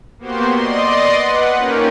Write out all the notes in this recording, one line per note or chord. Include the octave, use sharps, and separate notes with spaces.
A#3 B3 F#4 G4 C5 C6
D5 D#5 C6
B4 F#5
A#3 C#4 D#4 F4 G4 A#4